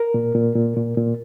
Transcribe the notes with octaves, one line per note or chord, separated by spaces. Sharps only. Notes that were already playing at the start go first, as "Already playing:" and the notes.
Already playing: A#4
A#2
A#2
A#2
A#2
A#2